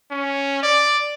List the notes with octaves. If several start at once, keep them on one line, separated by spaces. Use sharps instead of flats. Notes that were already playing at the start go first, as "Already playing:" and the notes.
C#4
D5